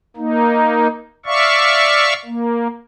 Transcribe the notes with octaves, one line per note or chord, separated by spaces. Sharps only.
A#3 D#4
D5 E5 F5 C#6
A#3